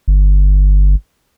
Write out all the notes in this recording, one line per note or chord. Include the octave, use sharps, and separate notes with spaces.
G1